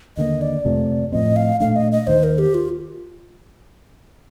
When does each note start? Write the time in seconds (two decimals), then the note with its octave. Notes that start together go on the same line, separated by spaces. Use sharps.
0.17 D#2 D3 G3 A#3 D#5
0.41 D5
0.65 F2 C3 F3 A3
1.12 A2 F3 C4 D#5
1.36 F5
1.60 A#2 A3 D4 F5
1.76 D#5
1.92 D#5
2.07 D#2 D#3 A#3 C5
2.23 A#4
2.38 G4
2.55 F4